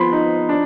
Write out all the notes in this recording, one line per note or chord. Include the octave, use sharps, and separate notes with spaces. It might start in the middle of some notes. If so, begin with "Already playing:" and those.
Already playing: F3 B3 B5 C6
D#4
D4